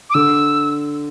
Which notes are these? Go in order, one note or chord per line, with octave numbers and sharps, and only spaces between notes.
D6
D3 E6